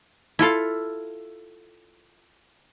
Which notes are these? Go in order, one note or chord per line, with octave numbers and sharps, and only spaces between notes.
E4 F4 A4 F5